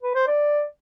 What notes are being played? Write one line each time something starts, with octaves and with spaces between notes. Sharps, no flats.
B4
C5
D5